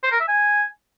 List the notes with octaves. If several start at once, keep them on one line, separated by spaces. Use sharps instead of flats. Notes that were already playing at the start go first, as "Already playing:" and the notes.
C5
A#4
E5
G#5